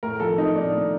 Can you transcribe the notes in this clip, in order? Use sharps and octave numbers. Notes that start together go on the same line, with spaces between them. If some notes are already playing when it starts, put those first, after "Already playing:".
A2 A#4
F3 A4
A3 D#4
A2 D4
A2